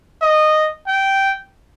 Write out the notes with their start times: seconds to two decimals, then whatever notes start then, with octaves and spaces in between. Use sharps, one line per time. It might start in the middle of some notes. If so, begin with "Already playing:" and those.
0.22 D#5
0.88 G5